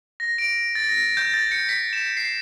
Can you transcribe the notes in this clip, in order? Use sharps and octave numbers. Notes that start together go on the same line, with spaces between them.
A#6
D7
A6
A#6
G6
A6
C#7
B6
E7
C7